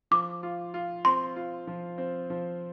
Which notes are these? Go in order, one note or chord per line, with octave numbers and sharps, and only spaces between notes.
F3 D6
F4
F4
C4 C6
F4
F3
C4
F3